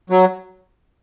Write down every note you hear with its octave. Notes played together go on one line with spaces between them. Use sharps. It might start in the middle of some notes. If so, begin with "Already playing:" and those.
F#3